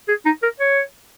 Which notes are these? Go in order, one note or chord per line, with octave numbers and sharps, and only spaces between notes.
G#4
D#4
A#4
C#5